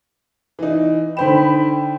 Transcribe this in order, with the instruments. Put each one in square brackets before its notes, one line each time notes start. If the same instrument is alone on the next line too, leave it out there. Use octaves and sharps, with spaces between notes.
[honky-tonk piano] E3 D#4
[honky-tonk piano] D3 C5 E7 [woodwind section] D#4 G5 B5